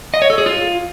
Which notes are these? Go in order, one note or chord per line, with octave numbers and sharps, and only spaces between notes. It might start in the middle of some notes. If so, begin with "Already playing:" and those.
D#5
C#5
A4
G#4
F4